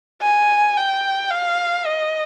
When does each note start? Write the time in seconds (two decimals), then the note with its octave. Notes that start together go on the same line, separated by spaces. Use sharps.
0.22 G#5
0.77 G5
1.31 F5
1.86 D#5